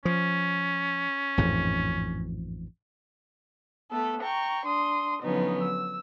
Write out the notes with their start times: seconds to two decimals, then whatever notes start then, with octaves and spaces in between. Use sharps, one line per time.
0.05 F3 C#4
1.38 A1 F2 G#2
3.91 A3 B3 A4
4.22 G5 A#5 C#6
4.66 D4 C6 D#6
5.22 D3 F3 F#3 B3 C#4 D#4
5.62 E6